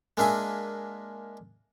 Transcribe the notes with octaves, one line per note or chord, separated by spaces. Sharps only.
G#3 A#3 D4 E5 G#5